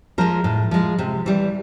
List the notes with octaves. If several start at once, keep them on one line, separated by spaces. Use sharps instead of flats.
F3 G#3 A#4
A2
F3 G#3
C3
E3 G3